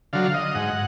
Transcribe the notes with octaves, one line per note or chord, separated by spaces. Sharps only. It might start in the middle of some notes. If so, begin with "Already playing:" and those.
D3 F#3 F5
D#5
G#2 F#5